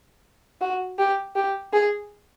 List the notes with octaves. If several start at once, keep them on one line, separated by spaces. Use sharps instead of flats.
F#4
G4
G4
G#4